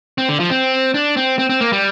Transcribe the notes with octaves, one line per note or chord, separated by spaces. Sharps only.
C4
D3
F3
C4
D4
C4
C4
C4
A#3
G3